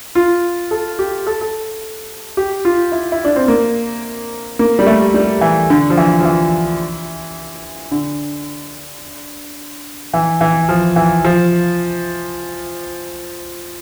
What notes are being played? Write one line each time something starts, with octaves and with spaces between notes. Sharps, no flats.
F4
A4
G4
A4
A4
G4
F4
E4
E4
D4
C4
A#3
A#3
G3
A3
G3
E3
D3
F3
E3
F3
E3
D3
E3
E3
F3
E3
F3